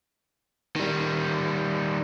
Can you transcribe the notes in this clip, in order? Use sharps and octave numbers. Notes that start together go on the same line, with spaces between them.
D#3 G3